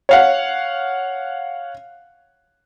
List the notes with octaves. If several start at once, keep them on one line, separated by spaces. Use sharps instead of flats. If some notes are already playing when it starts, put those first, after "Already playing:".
C#5 F5 F#5